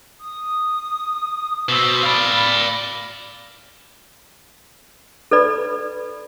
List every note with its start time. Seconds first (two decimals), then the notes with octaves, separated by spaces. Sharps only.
0.20 D#6
1.69 B2 C5 E6
2.03 D5 F5 B5
5.31 A4 B4 D5 B5